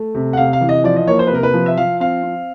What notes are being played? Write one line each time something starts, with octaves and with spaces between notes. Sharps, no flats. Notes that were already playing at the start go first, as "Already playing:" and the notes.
Already playing: A3
C3
F#5
C3 F5
F5
E3
D#5
F3 D5
D#5
A#3 C#5
C5
B4
C3 A#4
B4
F3
E5
F3 F5
C4 F5
C4